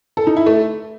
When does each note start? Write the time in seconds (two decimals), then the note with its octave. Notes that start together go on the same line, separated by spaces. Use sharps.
0.17 A4
0.27 D#4
0.37 E4
0.46 A3